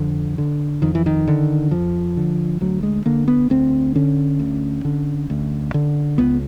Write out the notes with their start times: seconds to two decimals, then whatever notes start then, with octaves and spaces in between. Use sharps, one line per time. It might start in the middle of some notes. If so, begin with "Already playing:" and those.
Already playing: F2 D3
0.38 D3
0.82 F2 D#3
0.95 E3
1.06 D#3
1.28 D3
1.71 F2 F3
2.17 D3
2.61 D2 F#3
2.83 G#3
3.06 D3 A#3
3.28 B3
3.50 D2 C4
3.95 D3 C#4
4.39 D2
4.85 D3
5.30 D2
5.74 D3
6.18 C#2 B3